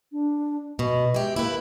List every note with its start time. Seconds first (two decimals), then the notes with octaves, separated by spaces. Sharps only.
0.12 D4
0.79 B2 D#5
1.14 G#3 G4 E5
1.36 A#3 E4 B4